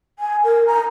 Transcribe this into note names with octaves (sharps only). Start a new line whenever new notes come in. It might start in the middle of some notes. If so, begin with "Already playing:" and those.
G#5
A#4
A#5